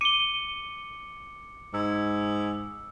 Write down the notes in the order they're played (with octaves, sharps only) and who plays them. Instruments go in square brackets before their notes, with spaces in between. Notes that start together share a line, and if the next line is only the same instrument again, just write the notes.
[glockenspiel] D6 C#7 [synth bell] D#7 G7
[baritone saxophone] G#2 [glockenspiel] E6